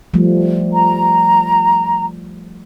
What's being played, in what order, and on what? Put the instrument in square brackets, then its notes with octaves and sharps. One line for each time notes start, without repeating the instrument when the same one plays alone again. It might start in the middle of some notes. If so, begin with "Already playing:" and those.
[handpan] F3 G3 A3
[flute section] A#5